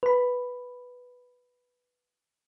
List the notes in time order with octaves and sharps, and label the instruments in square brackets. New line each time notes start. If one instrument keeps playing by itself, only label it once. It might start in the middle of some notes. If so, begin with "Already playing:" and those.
[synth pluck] B4 B5